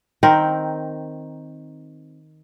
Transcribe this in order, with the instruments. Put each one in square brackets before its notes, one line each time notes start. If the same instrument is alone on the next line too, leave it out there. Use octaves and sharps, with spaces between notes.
[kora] D#3 C4 A#4